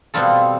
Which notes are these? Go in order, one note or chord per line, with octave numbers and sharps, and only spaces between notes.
B2 G3 C4 F4 A4